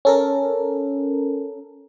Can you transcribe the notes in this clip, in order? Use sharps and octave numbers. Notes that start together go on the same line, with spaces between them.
C#4 A4 A#4